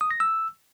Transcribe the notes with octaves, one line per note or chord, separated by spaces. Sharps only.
D#6
A#6
E6